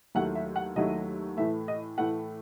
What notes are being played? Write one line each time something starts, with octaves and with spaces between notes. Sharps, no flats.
D#2 D#3 F#3 A3 E4 F#5
E5
F#5
D#2 D#3 F#3 A3 E4 D#5
A2 E3 A3 E5
D#5
A2 E3 A3 F#5